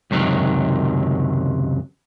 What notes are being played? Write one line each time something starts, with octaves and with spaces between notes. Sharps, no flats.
C#2 F#2 C3 D#3 F#3